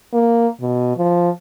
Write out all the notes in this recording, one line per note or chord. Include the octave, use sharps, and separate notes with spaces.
A#3
B2
F3